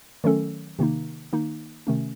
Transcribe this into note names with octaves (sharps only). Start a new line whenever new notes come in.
D#3 F#3 A3 C#4 A4
C3 D#3 A#3 D#4
D#3 A#3 D#4
C3 D#3 A3 C#4